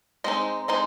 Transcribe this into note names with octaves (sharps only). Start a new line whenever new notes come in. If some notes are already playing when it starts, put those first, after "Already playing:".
G#3 C4 D#4 C5 D#5
G#3 C4 D#4 C5 D#5